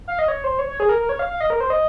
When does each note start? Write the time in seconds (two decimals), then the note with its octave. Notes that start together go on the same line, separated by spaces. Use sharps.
0.08 F5
0.19 D#5
0.28 C#5
0.44 C5
0.59 C#5
0.69 C#5
0.80 G#4
0.89 A#4
1.00 A#4
1.09 C#5
1.19 F5
1.30 F5
1.41 D#5
1.50 A#4
1.61 C5
1.70 D#5